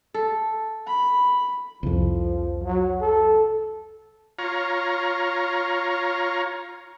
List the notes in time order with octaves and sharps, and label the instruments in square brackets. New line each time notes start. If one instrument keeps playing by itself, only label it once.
[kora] A4
[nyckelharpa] B5
[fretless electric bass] C2 F2 [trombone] F3
[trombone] F#3
A4
[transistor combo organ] F4 C#5 A#5